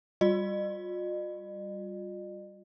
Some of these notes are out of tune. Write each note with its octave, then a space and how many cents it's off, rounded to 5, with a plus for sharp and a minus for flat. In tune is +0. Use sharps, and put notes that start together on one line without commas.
G3 +0 F4 +40 D#5 -45